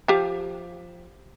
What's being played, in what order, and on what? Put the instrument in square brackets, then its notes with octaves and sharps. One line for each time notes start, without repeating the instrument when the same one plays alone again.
[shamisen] F3 G4 F5